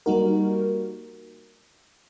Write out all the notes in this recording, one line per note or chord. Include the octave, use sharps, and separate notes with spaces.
G3 A#3 D#4 F#4 A#4